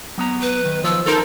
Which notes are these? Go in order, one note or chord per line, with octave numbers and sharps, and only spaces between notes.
F#3 B3 A#5
B4
D#3
F3 E6
F#2 F3 D#4 A4 A#4 C6